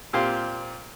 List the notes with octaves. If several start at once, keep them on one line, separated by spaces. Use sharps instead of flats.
A#2 C4 G4 F5 C6